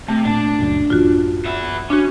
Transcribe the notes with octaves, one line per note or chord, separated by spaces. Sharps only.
C3 A3
A#2 D4 A5
C#2 F#2 A#2
A1 F#2 E3 F4 F#4
B3 E5
C#4 D4 F#4